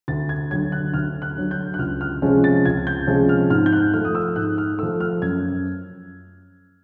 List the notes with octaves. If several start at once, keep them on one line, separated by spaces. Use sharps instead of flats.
D2 A6
G#6
D3 F#3 G#6
F#6
D2 F6
F#6
D3 F#3
G6
F#6
C#2 F6
F6
C3 F3 G#3 C#4
A6
C#2 G#6
G6
C3 F3 G#3 C#4
F6
G#2 F6
G6
F#6
F3 A3 F6
D#6
E6
G#2 F#6
F6
F3 A3 E6
F6
F#2 G#6